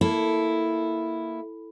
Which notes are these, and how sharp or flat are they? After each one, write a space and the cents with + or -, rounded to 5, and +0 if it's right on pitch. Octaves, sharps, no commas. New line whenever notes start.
A#3 +0 E4 +0 A4 +0